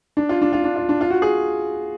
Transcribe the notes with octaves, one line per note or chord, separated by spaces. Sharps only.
D4
F4
D4
F4
D4
F4
D4
F4
F#4
G#4